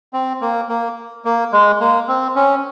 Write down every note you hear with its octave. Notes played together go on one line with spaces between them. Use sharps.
C4
A#3
A#3
A#3
G#3
A#3
C4
C#4